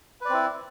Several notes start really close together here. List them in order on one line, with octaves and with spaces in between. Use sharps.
B4 D5 C4 E4